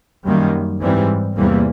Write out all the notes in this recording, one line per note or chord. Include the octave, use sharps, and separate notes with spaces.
F#2 D#3 G3 A#3
G#2 E3 G3 C4
E2 C3 E3 G3 A#3